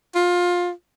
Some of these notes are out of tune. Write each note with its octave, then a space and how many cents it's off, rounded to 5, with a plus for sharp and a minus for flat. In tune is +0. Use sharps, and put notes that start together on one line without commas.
F4 +20